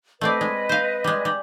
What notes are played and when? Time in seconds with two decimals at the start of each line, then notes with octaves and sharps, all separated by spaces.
0.21 A3 C4 B4 D5 D#5
0.41 G#3
0.69 C5 F5
1.04 G3 G#3
1.25 G3